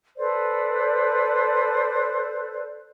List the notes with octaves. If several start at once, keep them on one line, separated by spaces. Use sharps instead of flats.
A4 B4 C5 D5